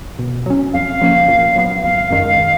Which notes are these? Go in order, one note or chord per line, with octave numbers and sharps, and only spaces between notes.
B2
F#3 C#4
F2 F5
C#3 F3 A#3 C#4
A#2
F#3 B3
G#1 F5
F#2 D#3 G#3